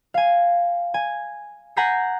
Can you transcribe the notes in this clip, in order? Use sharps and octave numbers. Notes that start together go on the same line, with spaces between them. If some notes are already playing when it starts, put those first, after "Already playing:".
F5 G#5
G#5
F#5 G#5 A#5 G6 B6 C7